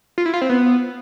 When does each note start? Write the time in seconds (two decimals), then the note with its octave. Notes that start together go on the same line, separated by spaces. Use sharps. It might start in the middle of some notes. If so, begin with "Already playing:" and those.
0.18 F4
0.26 E4
0.34 F4
0.41 C4
0.49 B3